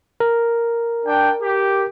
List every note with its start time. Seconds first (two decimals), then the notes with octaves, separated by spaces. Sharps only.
0.20 A#4
1.06 D4 G5
1.43 G4